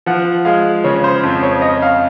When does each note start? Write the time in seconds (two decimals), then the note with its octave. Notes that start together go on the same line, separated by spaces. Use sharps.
0.06 F3 F#5
0.45 G#3 F5
0.84 C#3 C#5
1.04 C5
1.23 F2
1.43 C#5
1.62 C#4 D#5
1.82 F5